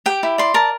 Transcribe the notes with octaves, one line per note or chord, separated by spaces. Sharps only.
G4 G5
E4
D5 C6
A#4 A5